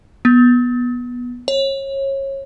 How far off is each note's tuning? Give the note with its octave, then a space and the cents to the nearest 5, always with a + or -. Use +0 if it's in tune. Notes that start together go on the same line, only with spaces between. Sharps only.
B3 -15
C#5 -25